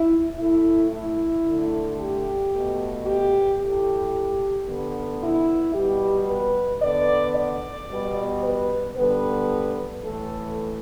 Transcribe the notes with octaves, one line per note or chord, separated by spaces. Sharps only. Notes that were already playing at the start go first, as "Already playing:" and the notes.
Already playing: E4
A2 A3 E4
E4
D3 A3
G4
B2 A3
G4
A2 A3 G4
D3 B3
E4
B2 G3 B3 G4
B4
D3 B3 D5
D5
B2 G3 B3
B4
D3 G3 B3 B4
A2 E3 A3 A4